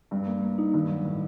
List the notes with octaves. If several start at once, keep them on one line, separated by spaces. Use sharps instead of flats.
G2 G3
A#3
A#3
D#4
G2 D#3
F#3
A2 D#3